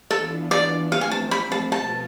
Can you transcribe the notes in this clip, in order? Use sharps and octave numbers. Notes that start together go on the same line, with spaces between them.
E3 B3 D4 F4 A4
D5
F3 A3 C4 F5
G#5
A5
B5
A5
B2 B3 F4 A5